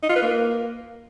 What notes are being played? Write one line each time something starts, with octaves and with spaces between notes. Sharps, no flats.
D#4
F4
B4
A#3